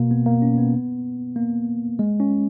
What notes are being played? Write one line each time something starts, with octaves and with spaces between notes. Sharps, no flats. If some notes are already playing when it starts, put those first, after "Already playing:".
Already playing: B2 A#3
B3
A#3
C#4
B3
A#3
G#3
C#4